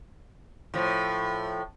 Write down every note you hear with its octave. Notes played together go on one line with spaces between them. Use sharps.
A2 F3